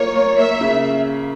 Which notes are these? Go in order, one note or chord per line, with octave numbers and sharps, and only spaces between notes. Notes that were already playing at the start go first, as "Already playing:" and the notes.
Already playing: A#3 F4 C#5
A#3
A#3 E5
C#3